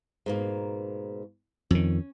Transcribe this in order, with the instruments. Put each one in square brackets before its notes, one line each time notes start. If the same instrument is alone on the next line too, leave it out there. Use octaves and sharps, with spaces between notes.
[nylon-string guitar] G#2 B2 A#3
[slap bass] F2 D#3 [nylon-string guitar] C#4